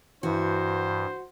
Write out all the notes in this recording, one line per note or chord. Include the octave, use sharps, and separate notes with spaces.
G2 E3 F#4 C5